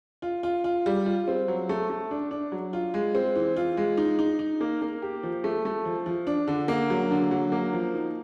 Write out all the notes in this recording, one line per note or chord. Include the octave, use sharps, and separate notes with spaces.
F4
F4
F4
G3
F4
C4
F#3
A3
A3
D4
D4
F#3
F4
G#3
C4
E3
F4
G#3
D#4
D#4
D#4
A#3
A#3
G4
F3
A3
A3
F3
F3
D4
D3
A#3
F#3
D3
F#3
A#3
F3
D#4